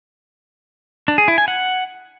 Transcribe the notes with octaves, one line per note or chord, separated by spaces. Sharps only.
D4
G#4
E4
G#5
F#5